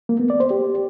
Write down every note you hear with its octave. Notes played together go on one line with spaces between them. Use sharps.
A#3
B3
D5
C5
G4